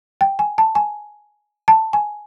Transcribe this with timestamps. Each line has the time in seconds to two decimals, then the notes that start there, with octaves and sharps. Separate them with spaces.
0.21 G5
0.39 G#5
0.58 A5
0.75 G#5
1.68 A5
1.93 G#5